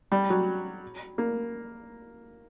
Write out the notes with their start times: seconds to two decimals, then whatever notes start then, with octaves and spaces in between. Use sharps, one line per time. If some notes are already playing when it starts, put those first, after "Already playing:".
0.12 G3
0.30 F#3
1.18 A#3